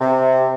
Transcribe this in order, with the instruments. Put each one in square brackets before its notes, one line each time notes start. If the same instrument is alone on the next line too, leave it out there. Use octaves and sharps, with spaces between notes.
[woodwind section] C3